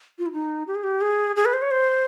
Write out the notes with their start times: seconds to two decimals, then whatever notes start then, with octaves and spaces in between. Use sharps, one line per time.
0.18 F4
0.26 E4
0.32 D#4
0.67 G4
0.75 G#4
0.83 G4
1.01 G#4
1.36 G#4
1.45 B4
1.53 C5
1.62 C#5
1.71 C5